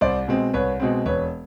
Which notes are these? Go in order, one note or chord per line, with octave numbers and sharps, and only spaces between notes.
C2 C5 D5
B2 G#3 C4
C2 B4 C#5
B2 G#3 C4
E1 B4 C#5